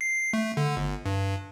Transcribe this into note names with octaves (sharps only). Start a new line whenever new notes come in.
C7
A3
D3
G1
G2